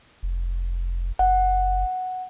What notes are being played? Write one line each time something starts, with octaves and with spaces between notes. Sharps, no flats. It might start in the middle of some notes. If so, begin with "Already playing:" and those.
F1
F#1 F#5